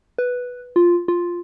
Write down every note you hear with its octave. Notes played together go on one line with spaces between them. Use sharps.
B4
F4
F4